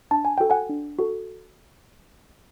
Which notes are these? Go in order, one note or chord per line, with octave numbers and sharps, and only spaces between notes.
D4 A5
G#5
F#4 A4 G5
F#5 G#5
D4
F#4 A4